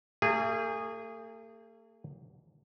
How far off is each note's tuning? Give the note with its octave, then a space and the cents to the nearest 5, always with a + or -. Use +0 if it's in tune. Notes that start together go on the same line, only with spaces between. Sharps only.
A3 +45 G#4 -20